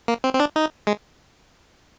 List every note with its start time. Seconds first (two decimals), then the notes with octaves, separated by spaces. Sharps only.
0.08 A#3
0.24 C4
0.34 C4
0.40 D4
0.56 D#4
0.87 G#3